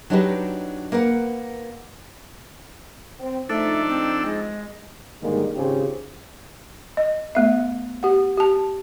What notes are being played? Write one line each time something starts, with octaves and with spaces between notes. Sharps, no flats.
F#3 D4 D#4 F#4 G4 B4
A#3 A#4 B4 F#5
C4
F3 A3 D4 D#4 A4
C4
G#3
G#2 D3 D#3 G3 G#3 A#3
G#1 G#2 C#3 C4 F4 G4
D#5
A3 B3 E5
G4 F#5
G4 A5